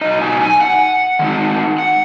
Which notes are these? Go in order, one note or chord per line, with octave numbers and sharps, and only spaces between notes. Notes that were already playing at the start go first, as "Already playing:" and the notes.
B2 F#3 D#4 D#5
G#5
G#5
F#5
D#3 G#3 D#4
F#5